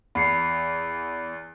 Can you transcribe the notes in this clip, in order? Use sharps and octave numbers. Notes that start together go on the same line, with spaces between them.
E2 B5 C7 C#7